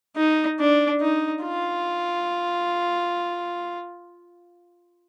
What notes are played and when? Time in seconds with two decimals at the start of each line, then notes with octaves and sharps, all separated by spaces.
0.17 D#4
0.59 D4
1.01 D#4
1.42 F4